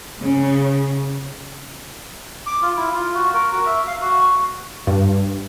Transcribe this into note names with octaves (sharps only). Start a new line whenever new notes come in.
C#3
D6
F4
E4
F4
F#4
A#4
F#4
E5
F5
F#4
G2